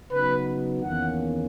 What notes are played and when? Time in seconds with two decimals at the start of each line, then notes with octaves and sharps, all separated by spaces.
0.11 C#3 F#3 B3 D#4 B4
0.84 E2 D#3 A#3 C#4 F#5